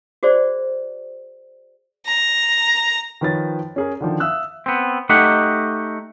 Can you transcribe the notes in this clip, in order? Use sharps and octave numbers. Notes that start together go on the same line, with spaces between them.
F#4 G#4 C5 D5
A#5
D#3 F3 B4 C#5 A6
C#4 G#4 A#4
D3 D#3 F3
E5 F5 D#6 E6 F#6
B3 C4
A3 D#4 G4 D#5 F#5